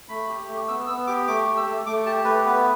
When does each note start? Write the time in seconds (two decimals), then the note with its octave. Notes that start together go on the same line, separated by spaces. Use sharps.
0.09 A3 B5
0.29 G4
0.48 A3
0.68 B3 E6
0.87 B3 E6
1.07 G4 D6
1.27 A3 D6
1.46 G4
1.57 E6
1.66 A3
1.86 A3 D6
2.06 G4 A5
2.25 A3 B4
2.45 B3 B4